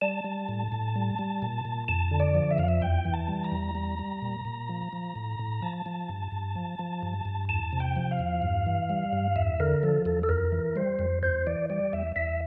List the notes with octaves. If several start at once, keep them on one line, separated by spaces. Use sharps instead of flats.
G3 A5
G3
A2
A2
G3
G3
A#2
A#2
F2 A5
D3
D5
F3
E5
F2 F5
E5
E2 G5
E3
A5
G3
A#5
E2
G3
G3
A#2
A#2
F3
F3
A2
A2
F3 A5
F3
G2
G2
F3
F3
G2
G2
E2 A5
C3
G5
F3
F5
E2
G2
E3
G3
G2
E2 E5
D3 A#4
F3 A4
E2 A4
A4
F2 A#4
E3
G3 C5
F2
E2 C5
E3 D5
G3 D5
E2 E5
E2 E5